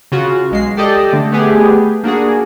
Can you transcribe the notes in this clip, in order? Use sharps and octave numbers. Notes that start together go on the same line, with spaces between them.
C#3 F4 F#4
B1 G#3 C7
G4 A4 D5 D#5 G5 A5
D3 A3
A3 B3 G4 G#4
A#3 D4 F#4 G#4